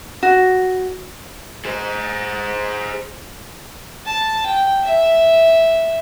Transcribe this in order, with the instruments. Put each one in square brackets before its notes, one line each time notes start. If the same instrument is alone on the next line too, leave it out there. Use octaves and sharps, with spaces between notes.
[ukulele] F#4
[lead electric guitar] G#4 C5
[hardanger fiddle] A5
G5
E5